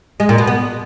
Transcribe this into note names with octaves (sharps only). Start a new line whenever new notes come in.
G#3
A#2
B2
B3